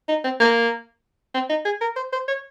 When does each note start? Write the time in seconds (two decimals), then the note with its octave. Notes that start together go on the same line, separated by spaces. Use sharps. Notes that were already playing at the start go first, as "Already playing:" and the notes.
0.09 D#4
0.24 C4
0.40 A#3
1.34 C4
1.50 D#4
1.65 G#4
1.81 A#4
1.96 C5
2.13 C5
2.28 C#5